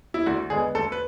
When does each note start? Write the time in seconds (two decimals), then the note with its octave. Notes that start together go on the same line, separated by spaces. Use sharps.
0.14 E4
0.26 D2 F#4
0.50 D3 G#3 B3 G#4
0.75 D2 A4
0.92 B4